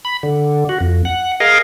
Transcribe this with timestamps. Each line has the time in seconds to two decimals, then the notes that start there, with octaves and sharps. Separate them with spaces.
0.05 B5
0.23 D3
0.69 F#4
0.81 F2
1.05 F#5
1.40 G#4 A#4 D#5 F5